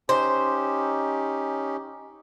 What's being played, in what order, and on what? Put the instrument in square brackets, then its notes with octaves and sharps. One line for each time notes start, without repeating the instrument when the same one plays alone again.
[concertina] C#4 D#4 G4 [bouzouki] C5